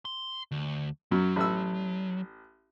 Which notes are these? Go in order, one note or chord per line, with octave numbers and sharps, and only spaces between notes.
C6
D2
F#2 F#3
A1 E6